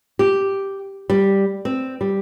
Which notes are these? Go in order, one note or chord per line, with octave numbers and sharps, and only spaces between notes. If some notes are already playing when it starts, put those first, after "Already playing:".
G4
G3
C4
G3